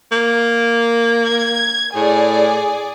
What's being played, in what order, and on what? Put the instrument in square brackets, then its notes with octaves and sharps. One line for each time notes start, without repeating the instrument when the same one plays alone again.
[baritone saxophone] A#3
[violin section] G#6
[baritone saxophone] A2 [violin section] G#4 D5